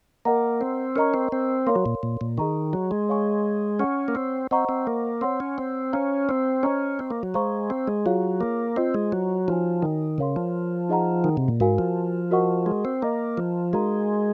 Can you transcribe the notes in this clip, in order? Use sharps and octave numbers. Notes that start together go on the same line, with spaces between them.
A#3 A#4 D#5 F#5 A#5
C4
C#4 A#4 D#5 A#5 C#6
C4
C4
A#3 A#4 C#5 F5 C6
F#3
A#2
A#2
A#2
D#3 G#4 D#5 A#5 C#6
F#3
G#3
C#5 F5 G#5 C#6
C#4 C#5 F#5 C#6
A#3
C4
C4 C5 D#5 F#5 A#5 C#6
C4
A#3
C4 C#5 F#5 C6
C#4
C4
C#4 C5 F5 A#5
C4
C#4 C5 D#5 A#5 C#6
C4
A#3
F#3
G#3 C5 F5 A#5 C#6
C4
G#3
F#3 F4 G#4 C#5 F5
A#3
C4 F4 C5 D#5
G#3
F#3
F3 D#4 F#4 C#5 G#5
D#3
C#3 A#4 C#5 F5 C6
F3
D#4 G#4 D#5 F#5 A#5
D#3
C3
A#2
G#2 F#4 A#4 F5 G#5
F3
F#4 A#4 D#5 F#5 C#6
G#3
C4
A#3 A#4 D#5 A#5
F3
G#3 D#4 F#4 A#4 F5 A#5